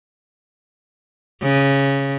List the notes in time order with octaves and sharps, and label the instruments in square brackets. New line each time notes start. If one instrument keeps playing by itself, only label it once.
[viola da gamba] C#3